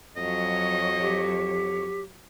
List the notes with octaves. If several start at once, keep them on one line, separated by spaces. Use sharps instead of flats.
F2 F#3 C#5 D#5
G4